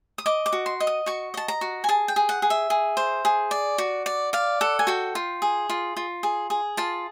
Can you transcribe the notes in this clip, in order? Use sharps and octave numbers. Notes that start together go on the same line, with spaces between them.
D#6
D#5 D6
D6
F#4
C6
D#5
D#6
F#4 C#6
D#5 A5
A#5
F#4
G#5
G#4 A5
G5
G#4
F#5
G#4
E5
G#4
C5
G#4
D5
F#4
D5
D5 F5
A4 F#5
G#5
F#4 G5
F4
G#4
F4
F4
G#4
G#4
F4 A5